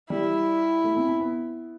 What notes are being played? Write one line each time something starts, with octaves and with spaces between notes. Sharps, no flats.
G3 E4
A3
C4
C4
B3